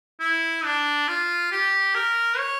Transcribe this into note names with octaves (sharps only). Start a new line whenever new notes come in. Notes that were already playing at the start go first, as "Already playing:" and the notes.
E4
D4
F4
G4
A#4
C#5